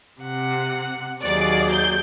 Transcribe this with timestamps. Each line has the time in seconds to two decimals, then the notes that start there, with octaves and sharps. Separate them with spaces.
0.21 C3 F#5
1.24 D#2 F#3 G#4 D5
1.71 G6